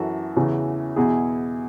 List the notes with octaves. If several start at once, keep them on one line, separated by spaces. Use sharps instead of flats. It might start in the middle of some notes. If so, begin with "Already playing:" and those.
Already playing: F#2 E3 F#4 A4
E2 C#3 E3
E2 B2 E4 G#4